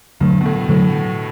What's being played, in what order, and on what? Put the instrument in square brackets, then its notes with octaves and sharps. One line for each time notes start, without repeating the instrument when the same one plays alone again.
[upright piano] G2 [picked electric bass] D3 F#3 A3
[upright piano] B2
A2
[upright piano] A2 [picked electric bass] D3 F#3 A3